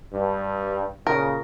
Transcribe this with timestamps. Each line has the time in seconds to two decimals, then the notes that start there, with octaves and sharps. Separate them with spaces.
0.13 G2
1.07 A#2 C#3 A#4